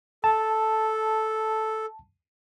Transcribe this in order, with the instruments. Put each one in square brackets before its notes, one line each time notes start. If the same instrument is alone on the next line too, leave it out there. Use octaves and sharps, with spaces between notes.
[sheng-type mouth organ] A4 [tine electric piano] A5